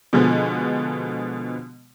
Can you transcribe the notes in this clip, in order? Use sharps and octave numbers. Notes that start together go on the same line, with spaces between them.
B2 D3 F3 G#3 B3